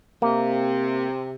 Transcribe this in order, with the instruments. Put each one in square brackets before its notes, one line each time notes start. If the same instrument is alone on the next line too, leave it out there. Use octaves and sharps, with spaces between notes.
[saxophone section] C3 [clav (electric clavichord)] A#3